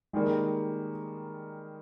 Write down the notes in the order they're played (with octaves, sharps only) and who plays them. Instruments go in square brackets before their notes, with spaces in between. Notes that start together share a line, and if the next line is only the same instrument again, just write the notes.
[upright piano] D#3 G3 A#3 [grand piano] G#3